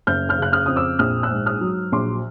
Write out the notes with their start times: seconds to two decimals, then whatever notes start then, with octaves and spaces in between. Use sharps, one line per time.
0.07 F#1 F6 G6
0.29 F6 G6
0.38 C#3 F#6
0.52 D#6 F6
0.66 F2 D#6
0.76 D6 E6
0.99 A#1 D#6 F6
1.23 E6 F#6
1.31 G#2
1.46 D#6 F6
1.61 F#3
1.92 A#1 C6 D6